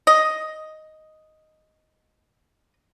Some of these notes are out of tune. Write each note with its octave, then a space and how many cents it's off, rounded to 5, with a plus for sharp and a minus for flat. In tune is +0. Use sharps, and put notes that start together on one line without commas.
D#5 +5